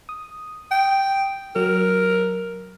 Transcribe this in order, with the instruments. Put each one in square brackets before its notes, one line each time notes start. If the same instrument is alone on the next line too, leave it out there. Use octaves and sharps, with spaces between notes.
[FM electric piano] D#6
[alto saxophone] G5
[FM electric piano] F#3 [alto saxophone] A#4